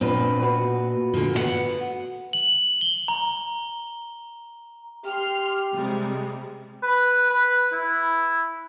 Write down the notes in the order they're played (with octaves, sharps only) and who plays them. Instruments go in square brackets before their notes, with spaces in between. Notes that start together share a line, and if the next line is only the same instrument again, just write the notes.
[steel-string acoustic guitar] A#2 [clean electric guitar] C4 D4 B4
[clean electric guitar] F#4 B4
[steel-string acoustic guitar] A#2 D3
B3 G4 F#5
[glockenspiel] F#7
G7
A#5
[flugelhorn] G4 [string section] C6 F6
[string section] C3 G3 G#3
[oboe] B4
B4
E4